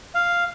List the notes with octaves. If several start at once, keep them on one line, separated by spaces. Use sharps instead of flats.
F5